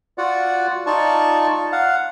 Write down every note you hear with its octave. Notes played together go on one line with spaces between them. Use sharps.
F4 F#4 D5 F#5
D#4 F4 D5 A5 C#6
F5 F#5